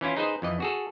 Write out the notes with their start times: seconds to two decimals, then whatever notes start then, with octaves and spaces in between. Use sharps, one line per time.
0.01 E3 C#4 E4 F4
0.16 D#4 G#4 B4 C5 D#5
0.42 F2 E3 D#5
0.60 F#4 G#4 A4